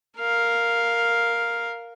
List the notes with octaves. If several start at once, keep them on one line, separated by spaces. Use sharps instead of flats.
A#4 F5